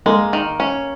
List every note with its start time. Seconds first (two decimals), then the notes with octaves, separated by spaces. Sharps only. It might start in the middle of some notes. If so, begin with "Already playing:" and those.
0.06 G#3 A#3
0.33 D#3
0.60 C#4